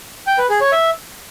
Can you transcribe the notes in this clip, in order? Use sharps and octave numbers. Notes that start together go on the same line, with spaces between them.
G5
B4
G#4
C#5
E5